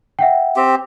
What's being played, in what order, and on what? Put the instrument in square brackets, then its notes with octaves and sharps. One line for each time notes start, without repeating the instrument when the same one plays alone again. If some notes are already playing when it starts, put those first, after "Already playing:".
[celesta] E5 F#5 G5
[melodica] C4 G4